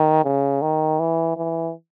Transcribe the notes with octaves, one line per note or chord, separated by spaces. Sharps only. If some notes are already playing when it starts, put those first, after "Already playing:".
Already playing: D#3
C#3
D#3
E3
E3